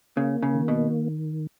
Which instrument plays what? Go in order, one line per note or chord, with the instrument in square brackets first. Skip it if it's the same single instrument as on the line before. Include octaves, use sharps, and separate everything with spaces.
[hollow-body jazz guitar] C#3 [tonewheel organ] A#3
[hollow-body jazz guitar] C#3
[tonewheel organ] D#3
[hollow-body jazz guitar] B2